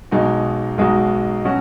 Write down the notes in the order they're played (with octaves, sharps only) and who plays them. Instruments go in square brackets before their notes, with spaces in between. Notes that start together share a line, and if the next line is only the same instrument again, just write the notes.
[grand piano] B1 B2 G#3 D#4 F#4
B1 B2 G#3 D#4 F#4
B2 F#3 C#4 F#4